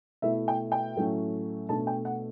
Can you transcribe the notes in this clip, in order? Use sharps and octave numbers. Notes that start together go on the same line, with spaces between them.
B2 A3 E4 E5
G5
G5
A2 F#3 A3 C#4
B2 A3 D4 A5
G5
F#5